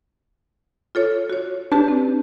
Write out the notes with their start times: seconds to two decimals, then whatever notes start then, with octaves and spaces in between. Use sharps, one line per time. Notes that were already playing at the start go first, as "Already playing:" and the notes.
0.95 F4 A4 C#5
1.30 F#4 C#5
1.72 D4 G4 B4 A5
1.88 C4